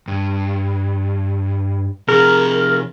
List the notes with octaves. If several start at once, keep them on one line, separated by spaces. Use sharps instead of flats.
G2
C3 F3 G#4 A#4